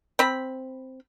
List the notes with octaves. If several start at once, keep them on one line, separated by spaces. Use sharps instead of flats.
C4 B5